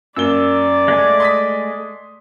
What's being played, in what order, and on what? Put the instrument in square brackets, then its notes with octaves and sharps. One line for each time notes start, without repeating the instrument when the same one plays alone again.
[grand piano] F#2 A#3 G7 [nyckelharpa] D5 [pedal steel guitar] E6
[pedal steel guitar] G#3 A3 G#5
[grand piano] C6 D#6 B6